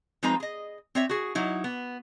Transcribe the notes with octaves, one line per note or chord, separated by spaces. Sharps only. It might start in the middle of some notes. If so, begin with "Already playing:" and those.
F3 G#3 C4 D#4 B4 A#5
G#4 D#5
C4 C#5 E5
F#4 G#4
F#3 D#4 E4
B3